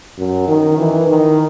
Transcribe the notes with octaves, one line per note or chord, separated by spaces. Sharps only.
F#2
D#3
E3
D#3